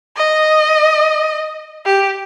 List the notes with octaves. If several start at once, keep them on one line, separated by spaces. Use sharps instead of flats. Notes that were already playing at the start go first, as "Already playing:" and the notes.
D#5
G4